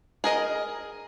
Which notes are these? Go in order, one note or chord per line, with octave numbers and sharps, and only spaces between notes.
G#4 A#4 D#5